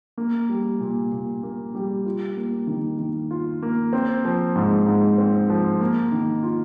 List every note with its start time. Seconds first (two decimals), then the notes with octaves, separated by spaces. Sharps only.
0.18 A#3
0.49 G3
0.80 A#2
1.12 A#2
1.43 A#3
1.75 G3
2.06 F4
2.37 A#3
2.67 D#3
2.99 D#3
3.31 F4
3.62 A#3
3.93 C4
4.25 F3
4.55 G#2
4.86 G#2
5.18 C4
5.50 F3
5.80 A#3
6.12 D#3
6.43 F4